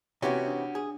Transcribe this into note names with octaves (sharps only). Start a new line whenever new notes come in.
C3 E3 B3 C#4 F#4 G4 C#5 F#5
D4 D5
G#4